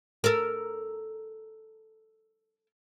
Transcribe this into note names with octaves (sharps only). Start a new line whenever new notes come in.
A4 A#4